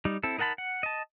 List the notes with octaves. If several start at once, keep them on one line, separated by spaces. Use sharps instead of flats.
G3 D#4
C4 E4 A4
D#4 A#4 F#5 A5 B5
F#5
D#5 A5